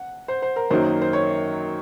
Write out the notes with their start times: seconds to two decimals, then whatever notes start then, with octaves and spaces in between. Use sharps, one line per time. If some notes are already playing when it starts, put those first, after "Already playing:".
Already playing: F#5
0.28 C5
0.42 C5
0.56 A#4
0.70 F#2 D#3 F#3 A#3 D#4 C5
1.02 C5
1.13 C#5